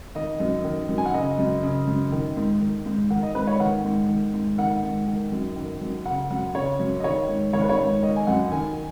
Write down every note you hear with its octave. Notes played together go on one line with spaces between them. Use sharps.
D#3 D#5
F#2
D#3
F#2
G#5
F#5
C#3 D#5
F#2
C#3
F#2
D#3
G#2
D#3
G#2
D#3 F#5
D#5
G#2 B4
C#5
D#3 F#5
G#2
D#3
G#2
D#3 F#5
G#2
D#3
F#2
D#3
F#2
C#3 F#5
F#2 F#5
C#3 C#5
F#2
D#5
D#3 C#5
G#2
D#3 C#5
B4
C#5
G#2
D#3 D#5
G#5
F#2 F#5
D#3 G#5